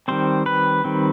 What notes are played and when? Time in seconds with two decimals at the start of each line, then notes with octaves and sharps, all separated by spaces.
0.08 D#3 G3 C4 C5
0.46 B4
0.84 D#3 G3 C4